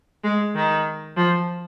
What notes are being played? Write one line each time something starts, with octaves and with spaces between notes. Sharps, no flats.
G#3
D#3
F3